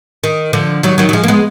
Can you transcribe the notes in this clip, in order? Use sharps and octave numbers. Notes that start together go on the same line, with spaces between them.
D#3
D3 F3
D#3 F#3
D#3 F#3
F#3
F3 G#3
A#3
G#3 B3